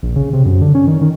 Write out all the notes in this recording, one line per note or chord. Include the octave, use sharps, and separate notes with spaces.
A#1
C#3
C3
F#2
D3
C#4
D#3
D#3